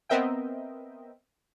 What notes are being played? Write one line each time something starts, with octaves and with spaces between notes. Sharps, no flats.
B3 C4 A#4 D#5 E5 G5